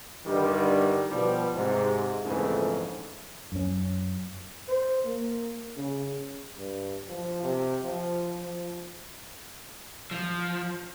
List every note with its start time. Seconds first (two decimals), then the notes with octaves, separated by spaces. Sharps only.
0.26 G2 D3 D#3 G3
1.10 B2 F3 G3
1.54 G#2 C3
2.24 A#1 F2 G#2 C#3 E3 A3
3.52 F#2 C#4
4.68 C5
5.05 A#3
5.77 C#3
6.57 G2
7.08 F3
7.43 C3
7.84 F3
8.41 F3
10.11 F3